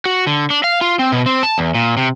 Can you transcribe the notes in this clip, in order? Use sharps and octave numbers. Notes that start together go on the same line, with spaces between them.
F#4
D3
D4
F5
F4
C4
B2
C4
A5
E2
A#2
C3